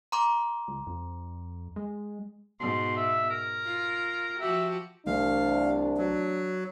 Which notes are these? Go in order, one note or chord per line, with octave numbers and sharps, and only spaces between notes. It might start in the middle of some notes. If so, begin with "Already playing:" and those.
A#5 C6 D6
C#2
F2
G#3
G#2 B2 C6
E5
A#4
F4
F3 F#4 G4 E5
C2 E3 A3 D4 F5
F#3